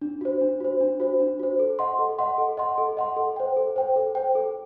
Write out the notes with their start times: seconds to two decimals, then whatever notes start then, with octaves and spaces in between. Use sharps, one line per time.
0.01 D4
0.21 F#4 C5
0.41 D4
0.60 F#4 C5
0.81 D4
1.00 F#4 C5
1.20 D4
1.40 F#4 C5
1.59 A4
1.79 D#5 F#5 C6
1.99 A4
2.19 D#5 F#5 C6
2.38 A4
2.57 D#5 F#5 C6
2.78 A4
2.97 D#5 F#5 C6
3.17 A4
3.36 C5 G5
3.57 A4
3.76 C5 G5
3.96 A4
4.15 C5 G5
4.35 A4